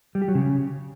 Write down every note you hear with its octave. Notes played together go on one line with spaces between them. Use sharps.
G3
G4
F#3
C#3